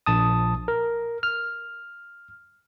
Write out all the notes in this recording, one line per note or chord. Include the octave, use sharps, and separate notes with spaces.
A#1 A5 D#6
A#4
F6